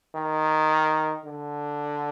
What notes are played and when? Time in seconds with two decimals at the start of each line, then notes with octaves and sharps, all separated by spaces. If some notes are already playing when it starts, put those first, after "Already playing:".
0.15 D#3
1.26 D3